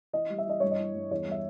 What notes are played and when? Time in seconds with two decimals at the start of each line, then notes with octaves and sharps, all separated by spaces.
0.13 E3 D#5
0.30 G3
0.38 E5
0.46 E3 D#5
0.60 G2 C#5
0.71 D#5
0.79 E3
0.95 G2
1.11 E2 C#5
1.27 G3 E5